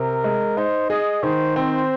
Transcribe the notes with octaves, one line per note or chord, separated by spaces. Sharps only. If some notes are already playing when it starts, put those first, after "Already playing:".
Already playing: C3 A#4
G#3
D#4 C5
G#4 D#5
D#3 C5
C4 C5